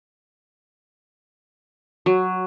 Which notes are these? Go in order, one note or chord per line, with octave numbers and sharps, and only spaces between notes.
F#3